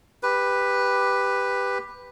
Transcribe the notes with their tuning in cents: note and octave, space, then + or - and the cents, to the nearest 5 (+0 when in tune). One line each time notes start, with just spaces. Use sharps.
G4 +10 B4 +0